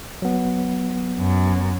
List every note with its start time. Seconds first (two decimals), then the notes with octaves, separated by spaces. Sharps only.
0.22 F#3 B3
1.18 F#2